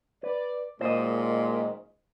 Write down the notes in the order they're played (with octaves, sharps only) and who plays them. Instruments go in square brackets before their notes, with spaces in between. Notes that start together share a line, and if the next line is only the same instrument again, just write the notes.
[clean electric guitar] B4 [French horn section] D5
[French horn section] F#2 D#3 G#3 [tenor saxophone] A#2 [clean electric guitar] C5 D#5